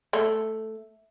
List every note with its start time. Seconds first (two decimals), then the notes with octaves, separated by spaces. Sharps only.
0.13 A3